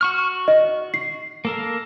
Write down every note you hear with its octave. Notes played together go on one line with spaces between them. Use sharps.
F#4 C#6 F6
D#5
C7
A#3 A4 A#4